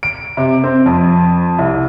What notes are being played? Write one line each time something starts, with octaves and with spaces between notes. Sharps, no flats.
D7
C3
C4
F2
C2